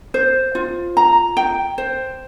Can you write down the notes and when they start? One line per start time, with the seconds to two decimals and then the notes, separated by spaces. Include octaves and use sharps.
0.14 C5
0.55 F4
0.97 A#5
1.37 G5
1.78 C5